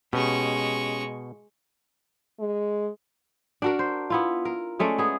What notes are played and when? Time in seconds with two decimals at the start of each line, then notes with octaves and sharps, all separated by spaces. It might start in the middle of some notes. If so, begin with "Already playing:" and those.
0.13 B2 G#3 C#4 G4 C#6
2.39 G#3
3.62 D4 F#4 A#4
3.79 C5
4.10 B3 E4 F4
4.45 A#4
4.79 G#3 A3 C#4 D5
4.98 B3 G#4